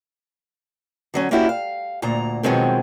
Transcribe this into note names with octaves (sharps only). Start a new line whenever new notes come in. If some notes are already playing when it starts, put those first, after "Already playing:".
D3 F#3 C#4
A#3 C#4 D4 E4 F#4 G4
F5
D2 A#2 A#5
B2 D#3 F3 F#3 G#3 C4